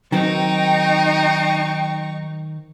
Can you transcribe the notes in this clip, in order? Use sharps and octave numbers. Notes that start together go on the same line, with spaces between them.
D#3 F#3 C4 D#4 G5 C#6